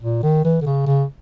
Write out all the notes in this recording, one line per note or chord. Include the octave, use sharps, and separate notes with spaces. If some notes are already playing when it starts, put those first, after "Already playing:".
A#2
D#3
E3
D3
C#3
C#3